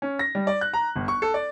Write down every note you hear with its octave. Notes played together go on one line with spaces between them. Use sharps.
C#4
A#6
G3
D5
F#6
A#5
G1
C#6
A4
D5